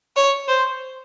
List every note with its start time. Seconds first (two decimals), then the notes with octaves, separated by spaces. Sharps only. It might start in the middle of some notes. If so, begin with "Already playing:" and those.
0.16 C#5
0.48 C5